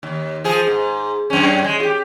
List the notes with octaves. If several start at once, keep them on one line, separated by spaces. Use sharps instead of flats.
D#2
F3 G#4
G#2
F#2 C#4
G#3
F4 G4